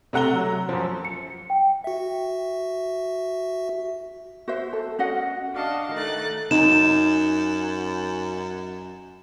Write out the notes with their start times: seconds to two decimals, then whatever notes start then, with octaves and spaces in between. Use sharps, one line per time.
0.13 C3 A3 F#5 A#5 G7
0.33 F#3
0.69 F#2 F3
1.05 C#7
1.50 G5
1.84 F#4 E5
4.48 F#4 C5 E5
4.73 A4
4.99 C#4 F#4 D#5 F#5
5.53 D4 F#4 D#5 F5 A5
5.93 D#3 A3 D#4 A4 F#6 A6
6.51 F#2 D#4 E7